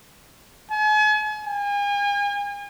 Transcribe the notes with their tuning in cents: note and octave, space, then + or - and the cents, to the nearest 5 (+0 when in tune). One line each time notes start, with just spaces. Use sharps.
G#5 +40
G#5 -40